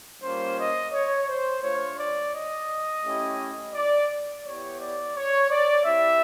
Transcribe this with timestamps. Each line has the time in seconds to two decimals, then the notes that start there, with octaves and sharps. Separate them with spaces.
0.22 G3 A#3 C#4 F4 C5
0.58 D#5
0.93 C#5
1.28 C5
1.63 A3 D4 F4 C#5
1.98 D5
2.34 D#5
3.04 A3 C#4 E4 G4
3.74 D5
4.45 B3 E4 G4 C#5
4.80 D5
5.16 C#5
5.51 D5
5.85 C4 E4 G4 E5